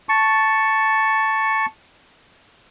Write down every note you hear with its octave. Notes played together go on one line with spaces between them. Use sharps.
A5 C#6